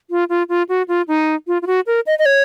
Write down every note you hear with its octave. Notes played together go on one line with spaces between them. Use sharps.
F4
F4
F4
F#4
F4
D#4
F4
F4
F#4
A#4
D#5
D#5
C#5